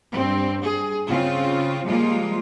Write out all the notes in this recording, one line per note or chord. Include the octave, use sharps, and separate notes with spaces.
G2 C4
G#4
C#3 C4 F4
F3 G3 G#3 A#3 F4